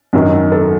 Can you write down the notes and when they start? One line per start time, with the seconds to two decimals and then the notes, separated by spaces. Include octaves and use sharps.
0.13 F#2 D#3 F#3
0.52 A4